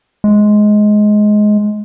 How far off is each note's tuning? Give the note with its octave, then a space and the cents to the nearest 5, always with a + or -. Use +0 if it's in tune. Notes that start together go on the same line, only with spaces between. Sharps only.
G#3 +15